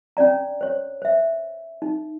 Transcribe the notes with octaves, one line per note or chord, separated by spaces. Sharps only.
C#4 D4 D5 A#5
C5 C#5
C5 E5
D#4